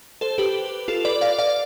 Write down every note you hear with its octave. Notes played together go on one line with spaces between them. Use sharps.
A4 C5
G4 B4
F4 A4
B4 D5
D5 F5
D5 F5